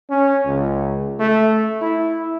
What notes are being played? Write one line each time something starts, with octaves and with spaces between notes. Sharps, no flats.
C#4
C#2
A3
E4